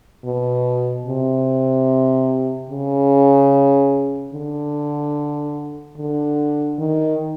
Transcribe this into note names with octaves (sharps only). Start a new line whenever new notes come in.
B2
C3
C#3
D3
D3
D#3